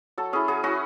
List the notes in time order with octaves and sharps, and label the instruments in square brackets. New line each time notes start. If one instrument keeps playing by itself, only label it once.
[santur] F#3 A4
C#4 E4 G#4
F#3 G#4
C#4 E4 F#4